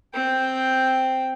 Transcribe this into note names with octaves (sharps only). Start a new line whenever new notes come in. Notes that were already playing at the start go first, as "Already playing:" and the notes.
C4 G5